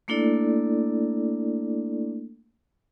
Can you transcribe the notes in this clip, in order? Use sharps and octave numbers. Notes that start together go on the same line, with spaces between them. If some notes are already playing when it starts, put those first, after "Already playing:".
A3 A#3 D4 E4 A4 D5